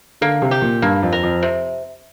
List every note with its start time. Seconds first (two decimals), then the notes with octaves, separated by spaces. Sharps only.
0.21 D3 A#3
0.42 C3
0.51 G4
0.62 A#2
0.82 G2 A#3
1.03 F2
1.12 A#4
1.23 F2
1.43 C3